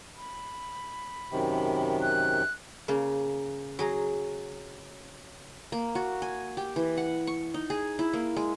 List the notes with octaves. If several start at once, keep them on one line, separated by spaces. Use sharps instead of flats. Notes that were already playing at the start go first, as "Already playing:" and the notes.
B5
F#2 C3 D#3
F#6
C#3 A#3
F#3 G#4 A#5
A#3
F#4
G#5
G4
E3
F#5
C#6
D#4
G#4
E4
A#3
G#3